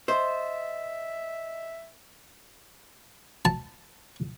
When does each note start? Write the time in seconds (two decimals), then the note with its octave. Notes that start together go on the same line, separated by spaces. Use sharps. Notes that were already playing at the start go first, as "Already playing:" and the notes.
0.08 C5 D#5 E5
3.45 A5